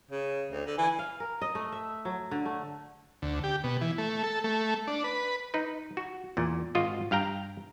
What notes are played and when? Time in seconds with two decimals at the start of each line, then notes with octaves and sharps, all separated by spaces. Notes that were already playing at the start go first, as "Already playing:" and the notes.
0.11 C#3
0.51 D2
0.66 D3
0.78 E3 G#5
0.99 F5
1.20 A#4
1.41 D#5
1.55 A3
1.72 E5
2.05 F#3
2.31 D3
2.46 A3
3.22 D2
3.44 G4
3.64 B2
3.81 E3
3.98 A3
4.24 A4
4.44 A3
4.87 D4
5.04 B4
5.54 D#4 B4
5.97 F#4
6.37 E2 A#2
6.75 G#1 F4 F#4 D#5
7.11 G2 F5 G5 A#5